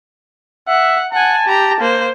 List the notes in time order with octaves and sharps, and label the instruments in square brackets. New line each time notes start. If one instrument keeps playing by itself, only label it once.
[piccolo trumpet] E5 [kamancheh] F#5
[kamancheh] F#5 G#5 [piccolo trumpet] A5
[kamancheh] G4 A#5
A#3 C5